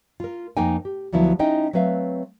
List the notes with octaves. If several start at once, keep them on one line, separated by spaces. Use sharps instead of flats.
F4 A#4
F2 A#3 D#4 G5 G#5
G4
D2 F3 F#3 B3 E4
C#4 D#4 E4 D#5 G5
F#3 A3 C4 B4 E5 F5